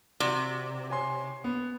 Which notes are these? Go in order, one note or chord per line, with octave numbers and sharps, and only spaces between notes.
C3 F#4 D5
C#5 G#5 C6
B3